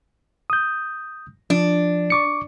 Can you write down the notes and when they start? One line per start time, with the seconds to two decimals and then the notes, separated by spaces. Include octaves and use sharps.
0.50 D#6 G6
1.50 F3 D4
2.10 C#6 D6 C#7